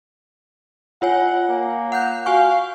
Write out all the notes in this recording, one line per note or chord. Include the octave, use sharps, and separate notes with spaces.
F4 C#5 F#5 G#5
A#3
F#5 F#6 G6
F#4 F5 G#5 C#6